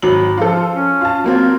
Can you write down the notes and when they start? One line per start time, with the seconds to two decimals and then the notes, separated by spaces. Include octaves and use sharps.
0.02 G#1 F#3 F#7
0.38 F3 F4 A4
0.74 C#4
1.01 F4 A5
1.24 F#3 A#3 C4 F4